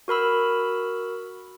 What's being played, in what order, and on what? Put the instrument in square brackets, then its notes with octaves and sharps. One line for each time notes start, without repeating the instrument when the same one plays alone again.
[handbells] F#4 A#4 B5 E6